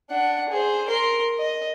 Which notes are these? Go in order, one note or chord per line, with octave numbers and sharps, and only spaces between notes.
D4 F#5
G#4 C5
A#4 C6
D#5